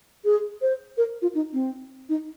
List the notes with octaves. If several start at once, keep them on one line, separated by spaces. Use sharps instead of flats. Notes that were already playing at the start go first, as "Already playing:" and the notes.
G#4
C5
A#4
F4
D#4
C4
D#4